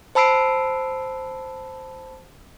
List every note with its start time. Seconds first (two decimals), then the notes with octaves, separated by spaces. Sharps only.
0.15 C5 A5 B5 E6 C7 D7